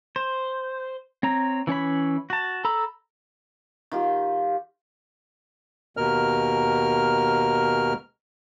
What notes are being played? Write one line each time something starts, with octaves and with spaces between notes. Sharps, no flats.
C5
C4 C#5 A#5
E3 C#4 C#5 B5
F#4 A5
A4 A#5 B5 E6
D#3 F4 G4
D#2 B2 A#4 F6